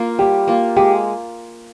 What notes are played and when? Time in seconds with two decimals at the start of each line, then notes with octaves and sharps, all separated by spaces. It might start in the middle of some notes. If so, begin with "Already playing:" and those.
Already playing: A#3 F4
0.19 G3 G4
0.48 A#3 F4
0.76 G#3 G4